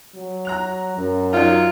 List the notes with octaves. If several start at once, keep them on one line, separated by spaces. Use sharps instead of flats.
F#3
A#5 F#6 F7
F#2
F#3 D4 D#4 F4